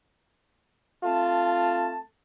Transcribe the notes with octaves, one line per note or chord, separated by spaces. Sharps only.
A3 C4 F4 A5